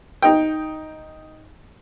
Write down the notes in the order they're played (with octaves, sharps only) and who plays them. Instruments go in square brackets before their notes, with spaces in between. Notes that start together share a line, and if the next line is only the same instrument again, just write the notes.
[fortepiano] D#4 G5